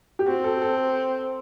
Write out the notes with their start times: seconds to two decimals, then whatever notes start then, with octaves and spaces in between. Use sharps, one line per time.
0.19 G4
0.26 C4 F#4
0.44 A4
0.62 A4